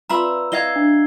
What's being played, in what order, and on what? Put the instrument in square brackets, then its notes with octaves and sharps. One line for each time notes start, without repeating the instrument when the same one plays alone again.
[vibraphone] C4 B4 D5 [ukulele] F4 E5 B5 [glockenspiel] A#5 E6
[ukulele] E4 D#5 F5 [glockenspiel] G#6 C7 G7
[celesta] D4